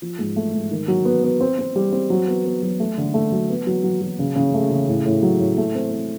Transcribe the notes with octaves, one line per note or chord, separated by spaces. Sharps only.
F3
G#2
A3
G#2
D#3
F#3
B3
B3
C4
C4
G3
C4
F#3
B3
B3
F#3
A3
D3
A3
F#3
B3
F#3
F#3
F#3
C#3
C#3
A3
C#3
A2
A2
F#3
A2
A3
C4
C4